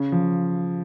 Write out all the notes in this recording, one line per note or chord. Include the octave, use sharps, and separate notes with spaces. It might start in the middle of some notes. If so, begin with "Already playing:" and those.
Already playing: C#3
F3